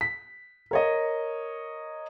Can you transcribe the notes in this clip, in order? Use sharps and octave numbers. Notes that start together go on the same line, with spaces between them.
B6
A#4 C#5 D#5